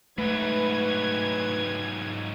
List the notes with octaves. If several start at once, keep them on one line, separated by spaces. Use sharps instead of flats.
G#2 F#3 A3 B4 G#6